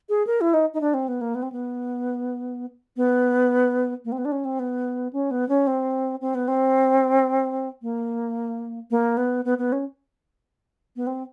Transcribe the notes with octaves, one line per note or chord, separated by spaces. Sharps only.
G#4
A#4
E4
D#4
D#4
D4
C4
B3
A#3
B3
C4
B3
B3
A#3
C4
B3
D4
C#4
C4
B3
C#4
B3
C#4
C4
C4
B3
C4
A#3
A#3
B3
B3
B3
C#4
B3
C4